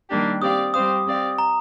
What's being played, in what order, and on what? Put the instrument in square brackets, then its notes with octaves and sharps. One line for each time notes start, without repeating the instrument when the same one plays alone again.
[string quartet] D#3 G3 A#3 D4 G4
[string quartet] C4 G4 D5 F5 [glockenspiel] D#6
[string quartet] G3 C4 G4 C5 F5 [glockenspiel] D#6
[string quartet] C4 G4 D5 F5
[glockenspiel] A#5